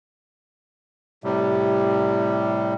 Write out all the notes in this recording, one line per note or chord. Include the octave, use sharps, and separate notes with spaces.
A2 C3 G3